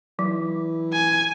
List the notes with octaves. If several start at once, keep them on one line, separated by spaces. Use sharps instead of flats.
E3 F#3
G#5